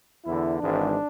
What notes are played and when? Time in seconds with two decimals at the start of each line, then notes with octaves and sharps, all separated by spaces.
0.25 E2 D3 E4
0.60 G#1 G#2 E3 D4